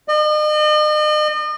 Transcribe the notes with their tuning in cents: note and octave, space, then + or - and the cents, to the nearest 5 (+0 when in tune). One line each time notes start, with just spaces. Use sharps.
D#5 -40